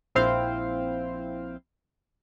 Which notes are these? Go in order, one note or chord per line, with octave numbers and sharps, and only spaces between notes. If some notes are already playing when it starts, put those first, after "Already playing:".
A#1 C4 E4 C5 F5 G5